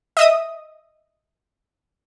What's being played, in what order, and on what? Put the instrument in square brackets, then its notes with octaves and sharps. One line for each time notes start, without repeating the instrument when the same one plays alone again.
[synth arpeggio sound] D#5 E5 D#6